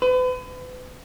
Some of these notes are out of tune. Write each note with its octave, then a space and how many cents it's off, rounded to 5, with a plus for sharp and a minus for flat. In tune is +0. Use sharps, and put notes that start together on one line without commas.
B4 +35